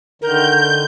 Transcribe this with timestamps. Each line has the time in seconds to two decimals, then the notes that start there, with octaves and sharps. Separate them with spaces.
0.22 D3 D#3 A#4 G6